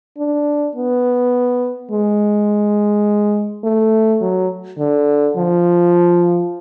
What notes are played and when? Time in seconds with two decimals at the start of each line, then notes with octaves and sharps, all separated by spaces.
0.18 D4
0.75 B3
1.91 G#3
3.64 A3
4.22 F#3
4.79 D3
5.37 F3